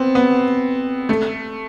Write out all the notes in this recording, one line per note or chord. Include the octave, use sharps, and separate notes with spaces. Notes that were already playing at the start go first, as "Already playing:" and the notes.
Already playing: B3 C4
B3
A3